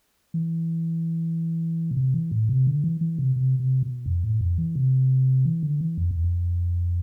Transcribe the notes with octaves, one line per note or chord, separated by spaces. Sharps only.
E3
B2
C3
E3
A2
C3
D3
E3
E3
C3
C3
C3
B2
F2
A2
F2
E3
C3
E3
D3
E3
F2
E2
F2